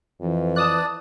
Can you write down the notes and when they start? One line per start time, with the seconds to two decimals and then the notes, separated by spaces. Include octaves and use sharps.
0.21 F2 E3
0.56 D5 A5 D#6 F#6